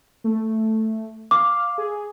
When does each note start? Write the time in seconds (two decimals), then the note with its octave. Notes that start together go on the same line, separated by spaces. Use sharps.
0.24 A3
1.31 F5 D6
1.78 G#4